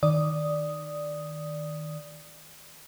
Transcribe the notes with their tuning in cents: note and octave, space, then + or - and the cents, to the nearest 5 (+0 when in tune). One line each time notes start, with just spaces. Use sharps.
D#3 +0 D5 +0 D#6 +0